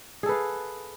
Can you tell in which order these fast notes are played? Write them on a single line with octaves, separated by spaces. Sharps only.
G#4 A4 B4 F5